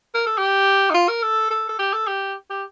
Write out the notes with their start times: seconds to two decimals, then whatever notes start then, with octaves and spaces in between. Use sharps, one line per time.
0.14 A#4
0.26 A4
0.38 G4
0.90 D#4
0.94 F4
1.08 A#4
1.22 A4
1.50 A4
1.69 A4
1.79 G4
1.93 A4
2.07 G4
2.50 G4